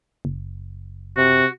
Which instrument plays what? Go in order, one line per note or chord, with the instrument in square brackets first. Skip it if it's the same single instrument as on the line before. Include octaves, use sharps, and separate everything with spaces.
[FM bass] F#1
[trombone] C3 [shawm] F#4